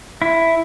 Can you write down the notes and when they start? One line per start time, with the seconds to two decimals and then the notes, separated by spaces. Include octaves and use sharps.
0.22 E4